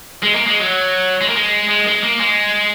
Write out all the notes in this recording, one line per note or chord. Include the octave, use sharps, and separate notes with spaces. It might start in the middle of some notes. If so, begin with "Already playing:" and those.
G#3
A#3
G#3
F#3
G#3
A#3
G#3
G#3
G#3
A#3
G#3